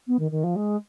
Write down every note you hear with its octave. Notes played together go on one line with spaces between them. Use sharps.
B3
D#3
D#3
F3
G#3